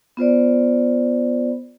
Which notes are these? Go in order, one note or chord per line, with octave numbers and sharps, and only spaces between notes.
B3 F4 C5 D5